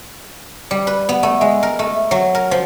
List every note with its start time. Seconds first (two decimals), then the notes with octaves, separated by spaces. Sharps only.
0.71 G3
0.87 B4
1.09 B3
1.23 A3
1.41 G#3
1.63 A#4
1.79 A3
2.11 F#3
2.35 A#4
2.51 F3